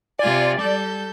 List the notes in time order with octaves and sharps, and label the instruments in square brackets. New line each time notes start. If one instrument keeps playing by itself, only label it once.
[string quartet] C3 F4 G#5 [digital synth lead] D5
[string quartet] G3 A4 G6